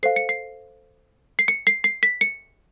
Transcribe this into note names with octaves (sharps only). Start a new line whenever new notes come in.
A4 C5 F5 C7
C#7
C7
C7
C#7
C7
C7
B6
C#7